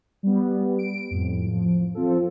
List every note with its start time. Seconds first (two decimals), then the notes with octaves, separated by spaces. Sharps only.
0.23 G3 B3
0.79 D7
1.11 F2 A2
1.46 F3
1.95 F3 C4 F4 A4